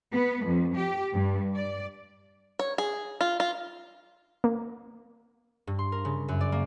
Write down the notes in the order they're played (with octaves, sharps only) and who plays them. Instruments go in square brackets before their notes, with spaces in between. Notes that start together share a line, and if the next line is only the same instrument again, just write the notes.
[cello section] B3
F2
G4
G2
D5
[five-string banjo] C#5
G#4
F4
F4
[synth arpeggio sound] A#3
[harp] G2
C6
A#4
C#3
F#2
D5
A#3